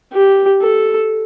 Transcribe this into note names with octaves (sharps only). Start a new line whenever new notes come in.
G4
A4